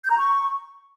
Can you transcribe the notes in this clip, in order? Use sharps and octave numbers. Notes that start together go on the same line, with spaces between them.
G6
A#5
C#6